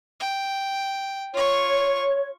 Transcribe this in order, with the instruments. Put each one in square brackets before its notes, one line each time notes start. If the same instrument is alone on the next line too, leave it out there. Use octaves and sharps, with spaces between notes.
[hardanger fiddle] G5
[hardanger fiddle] F4 C#6 [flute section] C#5